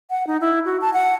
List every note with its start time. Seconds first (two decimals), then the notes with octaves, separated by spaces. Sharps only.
0.10 F#5
0.27 D#4
0.41 E4
0.65 F#4
0.81 A5
0.93 F#5